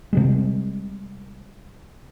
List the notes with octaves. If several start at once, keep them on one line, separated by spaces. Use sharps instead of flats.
C3 G3 G#3